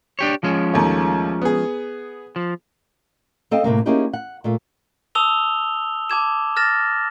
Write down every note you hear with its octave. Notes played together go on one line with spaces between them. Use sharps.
D4 G4 C#5
F3 G#3 C#4
D#2 A3
B3 G#4
F3
C4 A4 D#5 F5 G5
A2 C3 G#3 A#3
A#3 C#4 D#4 E4 G4 G#4
F#5
A#2 A3 F4
A5 D#6 E6 F7 G7
A5 D6 G#6 E7
F6 A6 A#6 E7